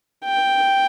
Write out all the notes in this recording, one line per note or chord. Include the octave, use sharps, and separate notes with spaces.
G5